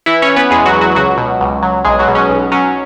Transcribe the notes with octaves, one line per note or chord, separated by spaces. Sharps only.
E3 E4 E5
C#4 C#5
E3
B3 B4
E2 G#3 G#4
F#3 F#4
E2
F#3 F#4
C#2 F#3 F#4
B2
C#2
F#3
B1 G#3 G#4
F#3 F#4
B2
C#4
B1
F#3 C#4